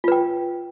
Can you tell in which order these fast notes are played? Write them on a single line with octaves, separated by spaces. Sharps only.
F4 B4 G5